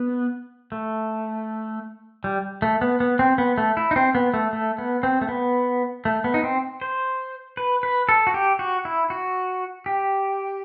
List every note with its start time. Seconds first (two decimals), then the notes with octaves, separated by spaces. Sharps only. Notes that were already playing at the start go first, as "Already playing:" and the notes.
Already playing: B3
0.72 A3
2.24 G3
2.62 A3
2.81 B3
3.00 B3
3.19 C4
3.38 B3
3.58 A3
3.77 E4
3.91 D#4
3.96 C4
4.15 B3
4.34 A3
4.53 A3
4.78 B3
5.03 C4
5.21 A3
5.29 B3
6.05 A3
6.24 B3
6.34 D#4
6.44 C4
6.81 C5
7.57 B4
7.83 B4
8.09 A4
8.27 F#4
8.34 G4
8.59 F#4
8.85 E4
9.10 F#4
9.86 G4